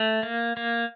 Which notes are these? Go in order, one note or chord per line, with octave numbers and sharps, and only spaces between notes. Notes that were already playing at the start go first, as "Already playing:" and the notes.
Already playing: A3
A#3
A#3